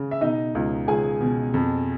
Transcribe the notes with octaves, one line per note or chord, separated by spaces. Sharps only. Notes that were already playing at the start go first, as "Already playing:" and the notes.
Already playing: C#3
E5
B2 D#4 D#5
C#2
C#2 G#4 G#5
B2
F2